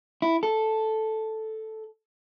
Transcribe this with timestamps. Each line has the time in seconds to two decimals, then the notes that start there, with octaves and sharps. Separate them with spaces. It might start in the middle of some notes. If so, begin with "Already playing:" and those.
0.22 E4
0.43 A4